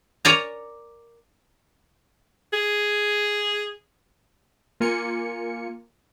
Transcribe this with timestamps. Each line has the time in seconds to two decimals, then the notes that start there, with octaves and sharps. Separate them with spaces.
0.25 A#4 C#5 D5 G#5 A#5
2.53 G#4
4.80 A#3 F4 G#5 C#7